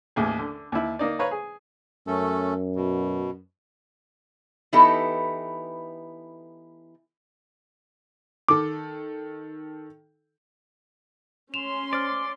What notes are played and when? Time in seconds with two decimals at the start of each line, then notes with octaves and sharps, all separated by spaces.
0.16 A1 D#2 G#4
0.39 D3
0.72 D#2 E4
0.99 A#3 D#4 D5
1.19 B4 C#5 F5 A#5
1.31 G#4
2.07 F#2 A3 C#4 A4
2.76 B2
4.73 E3 B3 D#4 E4 G4 A4
8.49 D#3 A4 D6
11.54 C#4 C6 E7 F7
11.93 C5 D5 D6 F6